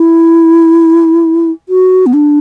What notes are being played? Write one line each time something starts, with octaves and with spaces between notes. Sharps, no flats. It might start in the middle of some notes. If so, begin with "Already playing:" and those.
Already playing: E4
F#4
B3
D4